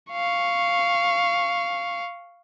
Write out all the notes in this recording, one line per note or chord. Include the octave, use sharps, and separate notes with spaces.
F5 C#6